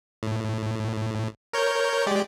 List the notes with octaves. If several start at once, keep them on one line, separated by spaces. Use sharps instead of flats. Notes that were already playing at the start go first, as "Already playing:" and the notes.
A2
A#4 C#5 G6
G#3 G4 D5